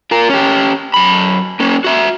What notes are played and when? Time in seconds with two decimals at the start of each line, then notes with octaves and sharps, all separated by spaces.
0.11 F4 A#4
0.29 C#4 G4
0.94 F#2 B5
1.60 A#3 C#4
1.84 F#4 E5